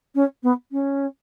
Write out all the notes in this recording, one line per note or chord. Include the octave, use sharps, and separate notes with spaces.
C#4
B3
C#4